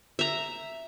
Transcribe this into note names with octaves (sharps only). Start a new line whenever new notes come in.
E5 A#5